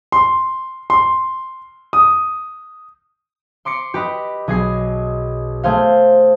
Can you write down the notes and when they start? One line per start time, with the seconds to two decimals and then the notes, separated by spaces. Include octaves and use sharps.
0.12 C6
0.90 C6
1.93 D#6
3.65 C6 D6 C7 C#7
3.94 G4 B4 D#5
4.47 B1 G#4 D#5 C7
5.63 A3 G#4 C5 F5